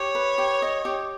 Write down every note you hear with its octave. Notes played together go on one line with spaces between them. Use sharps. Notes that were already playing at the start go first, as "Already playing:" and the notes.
Already playing: G4 C#5
B4
G4
D#5
G4